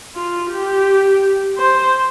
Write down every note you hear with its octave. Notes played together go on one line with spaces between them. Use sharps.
F4
G4
C5